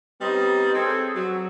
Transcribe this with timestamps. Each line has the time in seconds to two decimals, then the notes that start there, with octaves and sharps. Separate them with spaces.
0.21 G3 B3 C4 D#4 C#5 D#5
0.74 C4 G#4 A4
1.15 F#3